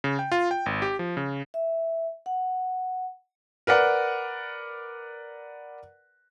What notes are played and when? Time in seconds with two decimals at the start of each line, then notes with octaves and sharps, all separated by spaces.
0.04 C#3
0.19 G5
0.32 F4
0.51 G5
0.66 G#1
0.82 G4
0.99 F3
1.17 C#3
1.54 E5
2.26 F#5
3.67 A#4 B4 D5 F#5